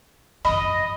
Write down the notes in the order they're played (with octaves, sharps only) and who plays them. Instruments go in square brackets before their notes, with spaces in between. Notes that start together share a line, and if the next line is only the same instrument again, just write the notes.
[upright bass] F#2 F3 [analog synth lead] D#5 [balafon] B5